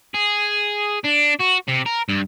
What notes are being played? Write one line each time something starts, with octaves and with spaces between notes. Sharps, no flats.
G#4
D4
F#4
C3
A#4
G2